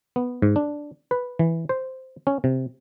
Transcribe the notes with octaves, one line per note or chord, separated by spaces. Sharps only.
B3
G#2
D4
B4
E3
C5
C#4
C3